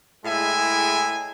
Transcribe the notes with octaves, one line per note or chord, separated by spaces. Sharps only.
A2 G#3 E4 G#4 E5 G#5